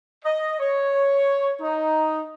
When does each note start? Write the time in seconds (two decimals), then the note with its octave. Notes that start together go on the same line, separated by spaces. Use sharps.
0.24 D#5
0.59 C#5
1.60 D#4